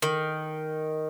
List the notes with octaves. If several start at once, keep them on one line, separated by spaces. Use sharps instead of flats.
D#3